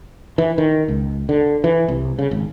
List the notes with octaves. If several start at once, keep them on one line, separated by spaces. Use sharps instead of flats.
E3
D#3
C#2
D3
E3
C2
C#3
G#1